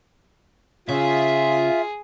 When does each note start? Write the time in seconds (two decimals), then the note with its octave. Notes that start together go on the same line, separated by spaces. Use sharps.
0.89 C#3 F4 G#4 E5